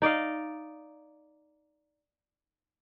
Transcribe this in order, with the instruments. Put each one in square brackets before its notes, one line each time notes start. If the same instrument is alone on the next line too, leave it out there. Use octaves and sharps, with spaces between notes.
[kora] D#4 D5 D#5 F5